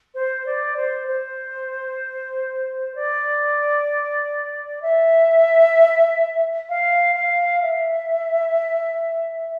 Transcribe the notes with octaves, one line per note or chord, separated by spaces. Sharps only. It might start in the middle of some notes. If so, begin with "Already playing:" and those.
C5
D5
C5
C5
D5
E5
F5
F5
E5